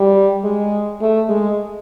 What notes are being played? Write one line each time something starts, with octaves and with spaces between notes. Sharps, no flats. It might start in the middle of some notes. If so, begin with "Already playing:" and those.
Already playing: G3
G#3
A3
G#3